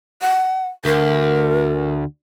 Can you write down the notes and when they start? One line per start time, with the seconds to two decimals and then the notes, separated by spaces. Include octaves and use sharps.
0.22 F#5
0.85 D2 A#4